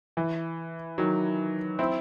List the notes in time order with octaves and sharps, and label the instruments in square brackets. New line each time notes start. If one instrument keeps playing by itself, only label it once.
[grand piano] E3
D#3 F#3
C4 E4